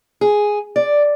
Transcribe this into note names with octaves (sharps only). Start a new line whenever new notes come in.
G#4
D5